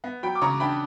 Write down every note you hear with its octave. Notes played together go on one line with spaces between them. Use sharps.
B3
F#3 G5 B5
D6
C#3 A#5 C#6
D4 G5 B5